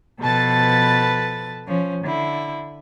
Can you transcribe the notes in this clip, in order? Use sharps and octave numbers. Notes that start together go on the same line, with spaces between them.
B2 F3 A4 B4 A5 A6
F3 C#4
D3 E4